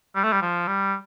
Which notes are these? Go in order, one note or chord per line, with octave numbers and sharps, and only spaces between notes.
G3
A3
G3
F3
G3